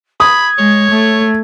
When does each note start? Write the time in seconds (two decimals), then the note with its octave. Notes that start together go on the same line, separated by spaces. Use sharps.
0.20 B5 D#6 G#6
0.58 G#3 C#5
0.90 A3